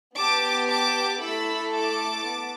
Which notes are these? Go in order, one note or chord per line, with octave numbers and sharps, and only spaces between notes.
B3 G4 A5 D6
A5 D6
A3 E4 A4 B5 E6
A5 D6
B3